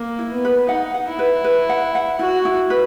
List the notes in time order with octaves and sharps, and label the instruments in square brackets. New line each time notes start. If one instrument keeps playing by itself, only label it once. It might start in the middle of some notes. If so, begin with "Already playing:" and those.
Already playing: [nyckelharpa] A#3
[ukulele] E4
[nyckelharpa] B3
[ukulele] B4
[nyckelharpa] D#4 [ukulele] F#5
[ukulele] F#5
[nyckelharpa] E4
[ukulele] B4
B4
F#5
F#5
[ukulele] E4 [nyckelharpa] F#4
[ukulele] E4
B4